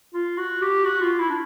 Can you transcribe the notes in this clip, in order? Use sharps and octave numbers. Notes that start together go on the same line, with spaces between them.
F4
F#4
G4
F#4
F4
E4
D4